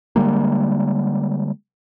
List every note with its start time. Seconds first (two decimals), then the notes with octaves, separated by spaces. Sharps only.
0.16 D3 G3 G#3 A#3